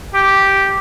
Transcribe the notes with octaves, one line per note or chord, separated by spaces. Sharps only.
G4